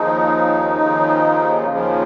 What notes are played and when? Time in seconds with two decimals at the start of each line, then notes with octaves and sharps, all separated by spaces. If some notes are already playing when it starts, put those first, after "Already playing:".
Already playing: D#2 C#3 F3 D#4
0.80 D#2 C#3 F3
1.68 D#2 C#3 F3